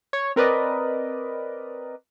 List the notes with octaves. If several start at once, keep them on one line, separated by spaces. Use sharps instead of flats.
C#5
C4 A#4 B4 D5 D#5